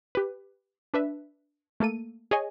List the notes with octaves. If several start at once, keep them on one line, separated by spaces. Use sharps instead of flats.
G4 B4
D4 B4 E5
A3 A#3 A4 D#7
G#4 C#5 D#5 G#5